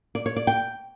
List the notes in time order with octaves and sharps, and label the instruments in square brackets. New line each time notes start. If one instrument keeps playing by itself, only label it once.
[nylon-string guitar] D5
C#5
D5
G5